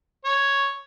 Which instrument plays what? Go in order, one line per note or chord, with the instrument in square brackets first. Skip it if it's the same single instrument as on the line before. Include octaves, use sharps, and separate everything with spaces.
[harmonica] C#5